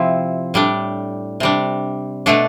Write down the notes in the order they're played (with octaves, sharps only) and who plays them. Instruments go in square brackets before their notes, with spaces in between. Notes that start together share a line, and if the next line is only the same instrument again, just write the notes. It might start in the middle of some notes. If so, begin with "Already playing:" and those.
Already playing: [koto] C3 F3 C4 E4
A2 G3 D4
C3 G3 D4
B2 A3 D4 A4